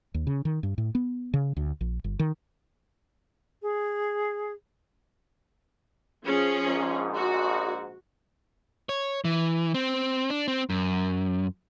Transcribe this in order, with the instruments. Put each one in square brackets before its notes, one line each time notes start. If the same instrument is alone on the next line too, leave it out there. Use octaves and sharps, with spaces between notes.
[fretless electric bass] D#2
C#3
D#3
G2
A2
B3
C#3
D2
A#1
G1
D#3
[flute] G#4
[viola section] F3 C#4 G#4
[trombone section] A#1 G#2
[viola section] F#4
[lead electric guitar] C#5
E3
C4
D4
C4
F#2